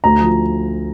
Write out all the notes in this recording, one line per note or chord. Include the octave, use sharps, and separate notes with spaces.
D2 A#5
F3